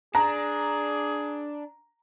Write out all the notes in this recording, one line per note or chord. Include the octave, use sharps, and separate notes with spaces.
D4 G#4 A#5